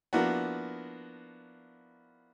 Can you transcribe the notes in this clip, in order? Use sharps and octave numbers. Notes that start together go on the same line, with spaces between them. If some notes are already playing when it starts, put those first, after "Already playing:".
F3 A#3 B3 D4 E4 F#4